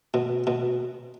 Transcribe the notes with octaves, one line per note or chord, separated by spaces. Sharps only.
B2
B2